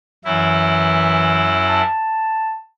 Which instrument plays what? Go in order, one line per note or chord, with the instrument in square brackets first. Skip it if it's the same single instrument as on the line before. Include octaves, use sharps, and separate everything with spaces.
[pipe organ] F#2 E4 [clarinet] E3
[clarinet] A5